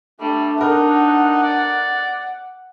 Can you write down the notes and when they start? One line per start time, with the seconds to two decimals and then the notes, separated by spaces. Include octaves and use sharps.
0.20 G3 A3 D4
0.61 D#4 A#4 F#5
1.43 D5